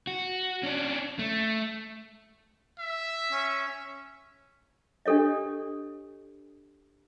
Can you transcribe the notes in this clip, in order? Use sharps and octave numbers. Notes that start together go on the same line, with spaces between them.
F#4
C#4 D4
A3
E5
C#4
D4 G4 A4 C#5 D#5